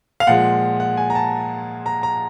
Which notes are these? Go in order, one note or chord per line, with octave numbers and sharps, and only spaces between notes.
F5
A#2 F3 G#3 F#5
F#5
G#5
A#5
A5
A#5
A#5